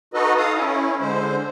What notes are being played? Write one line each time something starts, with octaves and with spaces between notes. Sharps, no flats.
D#4 F#4 A4 B4 D#5
A4 F5 D#6
C#4 E4
D3 G#3 C5